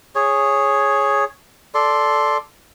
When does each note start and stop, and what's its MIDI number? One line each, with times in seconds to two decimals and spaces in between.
0.15 1.25 68
0.15 1.25 73
1.75 2.37 69
1.75 2.37 74
1.75 2.37 84